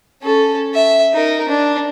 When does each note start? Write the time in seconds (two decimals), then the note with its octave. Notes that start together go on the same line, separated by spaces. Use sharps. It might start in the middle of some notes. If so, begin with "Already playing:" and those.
0.22 C#4 A4
0.75 E5
1.14 D#4 A#4
1.48 D4